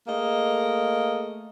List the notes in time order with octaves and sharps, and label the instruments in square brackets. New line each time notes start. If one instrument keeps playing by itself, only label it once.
[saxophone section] A3 A#3 G#4 D#5